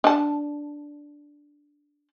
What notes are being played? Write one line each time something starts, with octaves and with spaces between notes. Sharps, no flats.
D4 A5